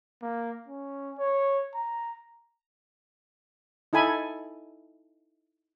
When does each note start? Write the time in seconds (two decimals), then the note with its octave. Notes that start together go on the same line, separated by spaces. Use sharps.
0.22 A#3
0.68 C#4
1.19 C#5
1.74 A#5
3.93 D#4 E4 A4 G#5 B5